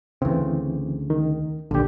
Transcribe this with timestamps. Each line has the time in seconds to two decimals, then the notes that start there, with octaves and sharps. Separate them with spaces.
0.22 D2 C#3 E3 C4
1.10 D#3
1.71 A#1 D#2 D3 G4